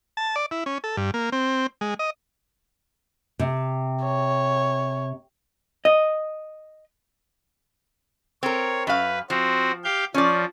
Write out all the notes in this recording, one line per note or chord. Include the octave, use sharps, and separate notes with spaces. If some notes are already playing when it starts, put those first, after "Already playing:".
A5
D5
E4
C#4
A4
G2
A#3
C4
G#3
D#5
C3
C#5
D#5
C4 A#4 C#5
F#2 B4 F5
F3 C4 F#4
G4 F5 G6
F3 C#4 D5